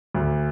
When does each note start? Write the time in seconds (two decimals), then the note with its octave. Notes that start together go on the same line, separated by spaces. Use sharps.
0.14 D2